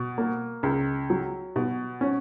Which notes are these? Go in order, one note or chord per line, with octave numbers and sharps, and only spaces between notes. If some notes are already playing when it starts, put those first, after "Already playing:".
Already playing: B2
A#3
C#2
F#3
B2
C#4